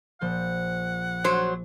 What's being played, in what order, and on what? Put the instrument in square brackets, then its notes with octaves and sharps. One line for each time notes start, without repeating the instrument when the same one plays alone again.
[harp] A#1 F3 G6 [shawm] F#5
[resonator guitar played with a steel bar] F#3 C5